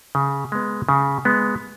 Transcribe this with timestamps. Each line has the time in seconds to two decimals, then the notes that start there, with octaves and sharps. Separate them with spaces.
0.15 C#3
0.52 G#3 B3
0.89 C#3
1.25 G#3 B3